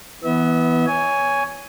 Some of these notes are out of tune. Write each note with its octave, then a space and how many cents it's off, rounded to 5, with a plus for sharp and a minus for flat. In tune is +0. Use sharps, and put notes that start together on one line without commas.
E3 -5 B3 +0 E5 -35
C#5 +15 G#5 +0